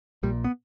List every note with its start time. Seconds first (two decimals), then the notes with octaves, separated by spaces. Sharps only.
0.23 A#1 A#2 G3
0.44 B3